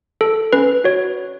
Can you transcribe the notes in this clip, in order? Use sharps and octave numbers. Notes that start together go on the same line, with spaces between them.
A4
C#4 B4
F#4 C#5